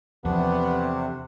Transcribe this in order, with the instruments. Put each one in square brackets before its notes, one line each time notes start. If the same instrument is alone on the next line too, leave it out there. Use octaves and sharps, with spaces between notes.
[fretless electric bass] E2 F3 [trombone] C3 [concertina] A3 D4 F#5 [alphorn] B3